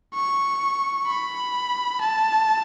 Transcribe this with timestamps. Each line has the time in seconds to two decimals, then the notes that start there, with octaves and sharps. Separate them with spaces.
0.15 C#6
1.08 B5
2.01 A5